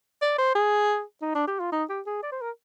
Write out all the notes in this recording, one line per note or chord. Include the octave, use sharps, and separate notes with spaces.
D5
C5
G#4
D#4
D4
G4
F4
D#4
G4
G#4
D5
C5
A#4